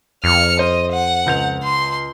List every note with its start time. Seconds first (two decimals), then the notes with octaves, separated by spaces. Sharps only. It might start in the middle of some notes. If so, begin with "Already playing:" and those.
0.24 F2 F6 C#7
0.59 C5 D#5
0.92 F#5
1.26 C#2 G6 F7
1.63 C6